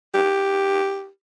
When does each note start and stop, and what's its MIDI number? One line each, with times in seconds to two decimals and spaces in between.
0.14 1.08 67